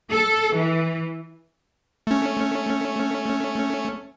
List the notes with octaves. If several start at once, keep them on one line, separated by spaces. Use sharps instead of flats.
A4
E3
A3 C#4